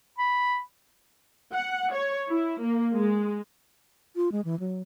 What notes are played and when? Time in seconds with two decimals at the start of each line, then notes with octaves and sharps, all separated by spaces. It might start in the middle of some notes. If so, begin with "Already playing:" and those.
0.18 B5
1.53 F#5
1.93 C#5
2.29 E4
2.60 A#3
2.95 G#3
4.16 F4
4.32 G#3
4.45 E3
4.60 F#3